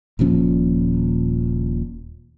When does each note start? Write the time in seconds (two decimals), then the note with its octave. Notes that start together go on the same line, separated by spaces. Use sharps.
0.19 D#1 A#2 F3 C#4